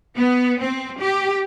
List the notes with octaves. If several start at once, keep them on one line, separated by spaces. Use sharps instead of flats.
B3
C4
G4